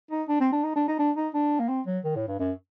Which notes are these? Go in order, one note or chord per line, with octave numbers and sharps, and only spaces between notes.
D#4
D4
C4
D4
D#4
D4
D#4
D4
D#4
D4
A#3
C4
F#3
D#3
A2
G2
F#2